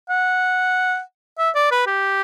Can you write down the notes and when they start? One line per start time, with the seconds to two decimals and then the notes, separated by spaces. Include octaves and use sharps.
0.10 F#5
1.39 E5
1.55 D5
1.71 B4
1.87 G4